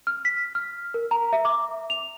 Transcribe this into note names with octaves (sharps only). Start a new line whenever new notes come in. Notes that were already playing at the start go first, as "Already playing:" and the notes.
F6
B6
F6
A#4
A#5
E5
D6
F7